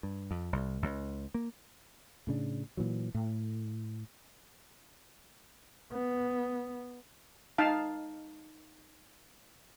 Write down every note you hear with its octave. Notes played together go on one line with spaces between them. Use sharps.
G2
F2
C2
C#2
A#3
A2 C#3 D4
A#2 E3 F#3
A2
B3
D#4 F5 A5